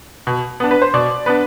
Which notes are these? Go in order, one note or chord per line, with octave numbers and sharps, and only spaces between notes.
B2
B3 D4
B4
C5
B2 D5
B3 D4 B4